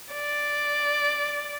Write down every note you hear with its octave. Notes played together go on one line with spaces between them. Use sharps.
D5